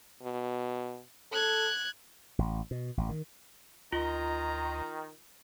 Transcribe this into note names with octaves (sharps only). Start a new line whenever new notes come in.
B2
A4 F#6 G#6
A1
B2
A1
D#3
D2 D#3 F4 D#5 A#5 C6